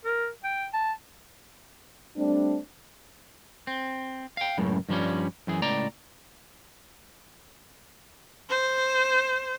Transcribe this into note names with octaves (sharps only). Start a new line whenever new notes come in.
A#4
G5
A5
G3 A3 C4 D4
C4
F5 G5
C#2 F#2 A2 C#3
G2 F3 G3 C#4
F#2 E3 G#4
C#2 A2 D5 A#5
C5